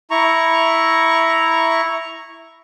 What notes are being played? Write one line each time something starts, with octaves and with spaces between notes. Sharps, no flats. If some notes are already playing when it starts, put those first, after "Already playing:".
E4 A#5 C#6